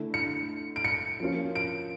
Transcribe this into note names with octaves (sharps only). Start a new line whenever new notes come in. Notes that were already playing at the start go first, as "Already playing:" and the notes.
Already playing: D3 A3 E4 A4
C#7
D7
C#7
F3 A#3 C#4 F4
D7